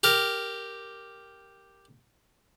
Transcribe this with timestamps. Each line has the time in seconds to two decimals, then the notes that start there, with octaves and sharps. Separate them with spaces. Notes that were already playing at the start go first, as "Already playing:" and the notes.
0.03 G4 A#4